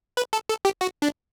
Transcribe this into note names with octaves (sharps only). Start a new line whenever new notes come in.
B4
A4
A4
G4
F#4
D4